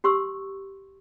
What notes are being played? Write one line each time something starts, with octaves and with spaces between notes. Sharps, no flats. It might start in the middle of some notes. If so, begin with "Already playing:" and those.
G4 C6 C#6 E6